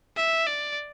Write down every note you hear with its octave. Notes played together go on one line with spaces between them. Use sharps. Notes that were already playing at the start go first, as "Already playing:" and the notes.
E5
D5